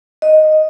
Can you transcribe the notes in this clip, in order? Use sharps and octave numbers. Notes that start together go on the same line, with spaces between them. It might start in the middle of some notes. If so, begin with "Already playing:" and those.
D#5